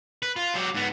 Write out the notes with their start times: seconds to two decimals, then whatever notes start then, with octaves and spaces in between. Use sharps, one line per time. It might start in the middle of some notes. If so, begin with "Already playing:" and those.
0.22 B4
0.36 F4
0.55 F#3 G4
0.75 G#2 B3